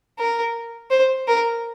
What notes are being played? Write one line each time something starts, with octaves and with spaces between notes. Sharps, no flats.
A#4
C5
A#4